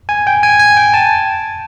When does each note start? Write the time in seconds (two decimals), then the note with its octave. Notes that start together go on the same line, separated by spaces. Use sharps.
0.09 G#5
0.27 G5
0.43 G#5
0.59 G#5
0.77 G5
0.94 A5